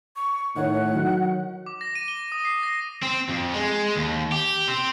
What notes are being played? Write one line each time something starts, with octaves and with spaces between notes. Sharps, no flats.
C#6
A2 D#3 C#5 F#5
D#3 F#3
D6
A#6
D#7
G7
D#6
C7
A#6
C4
F2
G#3
D#2
G4
C4